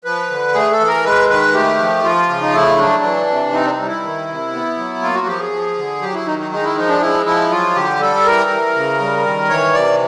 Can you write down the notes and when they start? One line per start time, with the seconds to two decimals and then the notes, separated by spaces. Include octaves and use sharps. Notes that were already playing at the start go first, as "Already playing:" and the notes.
0.05 F3 B4
0.30 D3
0.54 A3 G#4
0.71 A4
0.80 E3
0.88 A#4
1.05 G#3 B4
1.29 D#3 B4
1.54 A3 G4
1.79 F3
2.04 F3 F4
2.29 C#3
2.41 D#4
2.53 A3 E4
2.78 F#3 D4
3.03 E3
3.28 C3
3.53 C4 D#4
3.66 D4
3.70 D#4
3.78 G3
3.86 E4
4.03 D#3
4.28 C3
4.53 B3
4.77 F#3
5.02 A#3 F4
5.15 F#4
5.26 F3 G4
5.40 G#4
5.52 F3
5.77 D3
6.02 F#3 G4
6.14 E4
6.26 D#3 D#4
6.39 D#4
6.51 G#3 D#4
6.64 E4
6.76 F3 D#4
6.88 D4
7.01 G#3 E4
7.26 F3 E4
7.51 F#3 F4
7.75 D3 G4
8.00 G3 A4
8.25 E3 A#4
8.50 E3
8.75 C#3
9.00 G3
9.25 D#3
9.49 E3 C#5
9.74 C3 D5